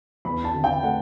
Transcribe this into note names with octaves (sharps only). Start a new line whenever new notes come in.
E2 B5
A5
D3
G5
A3 F#5